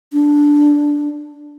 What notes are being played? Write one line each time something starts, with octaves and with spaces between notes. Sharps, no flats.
D4